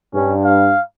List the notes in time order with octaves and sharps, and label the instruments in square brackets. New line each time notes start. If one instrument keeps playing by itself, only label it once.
[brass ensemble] G2 [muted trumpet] C#4
[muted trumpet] F5